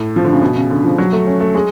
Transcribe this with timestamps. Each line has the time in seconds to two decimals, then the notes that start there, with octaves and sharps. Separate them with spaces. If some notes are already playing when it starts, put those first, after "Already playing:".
Already playing: A2
0.16 F3
0.24 D3
0.33 C#3
0.42 B2
0.56 C#3
0.70 D3
0.84 F3
0.98 F#3
1.13 A3
1.27 C#4
1.40 A3
1.55 G#3